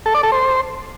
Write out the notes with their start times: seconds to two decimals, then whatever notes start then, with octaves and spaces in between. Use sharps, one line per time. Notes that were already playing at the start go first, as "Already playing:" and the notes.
0.06 A4
0.14 D5
0.23 A4
0.32 C5